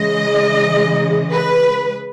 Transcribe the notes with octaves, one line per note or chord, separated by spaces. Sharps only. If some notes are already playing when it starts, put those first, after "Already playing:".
Already playing: C#3 E3 G#3 D#5
B4